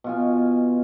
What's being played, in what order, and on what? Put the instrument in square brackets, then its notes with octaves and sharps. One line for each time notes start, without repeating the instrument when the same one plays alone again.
[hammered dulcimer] B2 F4 G#5